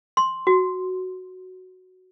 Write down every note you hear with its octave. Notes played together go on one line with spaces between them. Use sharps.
C6
F#4